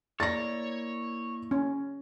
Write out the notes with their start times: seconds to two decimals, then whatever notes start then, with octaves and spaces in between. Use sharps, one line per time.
0.20 A#3 E4 C#5 D5 A6 A#6
1.51 C#4